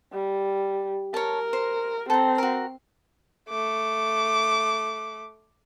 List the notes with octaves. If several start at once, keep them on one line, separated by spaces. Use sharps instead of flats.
G3
A#4 C#5 A5
C5
C4 A4 A#5
F#4 A#4
A3 D6